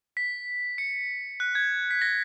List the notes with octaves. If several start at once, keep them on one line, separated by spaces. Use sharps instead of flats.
B6
C#7
F#6
G#6
B6
A#6